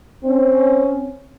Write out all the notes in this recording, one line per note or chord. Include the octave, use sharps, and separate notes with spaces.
C4 C#4